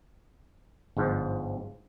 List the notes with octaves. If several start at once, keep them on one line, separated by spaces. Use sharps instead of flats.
G1 G#2 F3